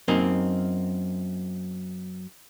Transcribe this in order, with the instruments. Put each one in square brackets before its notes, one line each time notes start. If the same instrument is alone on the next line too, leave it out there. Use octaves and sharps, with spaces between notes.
[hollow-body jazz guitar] F#2 A#3 C4 D#4